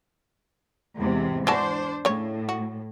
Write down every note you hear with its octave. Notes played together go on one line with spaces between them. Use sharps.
E2 G#2 C3
E3 D4 F#4 C5 A5
A2 C#3 C#5
F#4